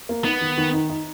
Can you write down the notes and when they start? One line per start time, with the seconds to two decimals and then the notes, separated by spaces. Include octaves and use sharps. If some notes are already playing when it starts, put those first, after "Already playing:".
0.09 A#3
0.25 B3 D#4
0.41 D#3
0.57 D#3
0.73 D#4
0.90 D#4